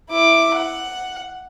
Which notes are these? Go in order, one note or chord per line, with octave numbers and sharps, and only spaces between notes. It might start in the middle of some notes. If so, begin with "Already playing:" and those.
E4 D6
F#5